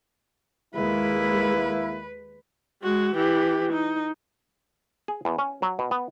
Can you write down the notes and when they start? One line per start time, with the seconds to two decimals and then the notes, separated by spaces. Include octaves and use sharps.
0.75 D#2 G#3 A#3 E4 B4
2.82 G#3 F#4
3.14 E3 G4
3.72 D#4
5.08 G#4
5.25 E2
5.39 C#4
5.62 F#3
5.79 B2
5.91 B3